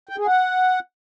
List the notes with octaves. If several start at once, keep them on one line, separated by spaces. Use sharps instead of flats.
G5
G#4
F#5